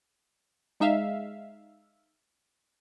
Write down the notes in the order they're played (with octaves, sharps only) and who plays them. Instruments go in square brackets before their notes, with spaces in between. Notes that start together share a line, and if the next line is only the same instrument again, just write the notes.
[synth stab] G#3 D#4 E5 F5